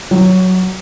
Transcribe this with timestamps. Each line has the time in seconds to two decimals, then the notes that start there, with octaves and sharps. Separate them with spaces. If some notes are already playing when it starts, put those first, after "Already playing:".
0.11 F#3